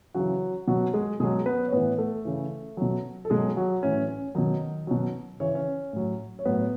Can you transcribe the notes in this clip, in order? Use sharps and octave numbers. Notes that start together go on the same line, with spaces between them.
C#3 E3 F#3 F#4
B2 F#3 F#4
G#3 G#4
B2 F#3 G#3 G#4
B3 B4
C#5
A2 E3 B3 B4
A3 A4
C#3 E3
B2 F#3
A4
B2 F#3 G#3 G#4
F#3 F#4
A2 E3 C#4
C#4
B2 D#3 F#3 D#4
B2 F#3
C#3 E3 C#5
C#4 C#5
A2 F#3
C#5
A2 F#3 B3 B4